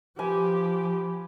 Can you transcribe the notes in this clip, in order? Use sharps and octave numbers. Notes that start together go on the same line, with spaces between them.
F3 G4 B4 G#5